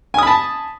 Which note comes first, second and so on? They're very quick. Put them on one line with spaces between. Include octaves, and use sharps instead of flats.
G#5 D#6 B5 A5